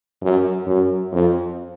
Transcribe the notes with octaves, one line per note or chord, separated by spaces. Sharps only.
F#2
F#2
F2